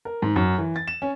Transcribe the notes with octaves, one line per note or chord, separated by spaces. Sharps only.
A#4
G#2
F#2
E3
A6
E7
C#4